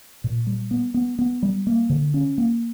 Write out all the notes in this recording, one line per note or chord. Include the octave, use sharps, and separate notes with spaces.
A#2
G3
B3
B3
B3
G3
A#3
D3
C#4
A#3